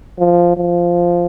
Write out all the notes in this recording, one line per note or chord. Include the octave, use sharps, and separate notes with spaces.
F3
F3